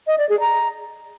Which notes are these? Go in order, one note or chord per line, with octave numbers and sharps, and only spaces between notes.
D#5
D5
G#4
A#5